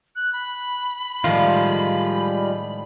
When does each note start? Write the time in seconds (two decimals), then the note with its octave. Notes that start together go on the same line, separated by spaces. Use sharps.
0.16 F#6
0.33 B5
1.24 A2 D#3 F3 G3 G#3 F4